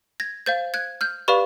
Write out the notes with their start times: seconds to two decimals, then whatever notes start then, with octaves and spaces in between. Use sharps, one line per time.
0.20 G#6 A#6
0.46 C5 F5 G6 A6
0.74 F#6 G#6
1.01 F6 G6
1.28 G4 B4 D5 F5 B5 C#6